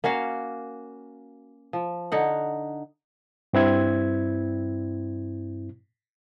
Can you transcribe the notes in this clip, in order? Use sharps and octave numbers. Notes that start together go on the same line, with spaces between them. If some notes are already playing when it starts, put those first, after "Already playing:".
A#3 C#4 F#4 F5
F3
D3 D#4 F#5
G2 C4 E4 G#6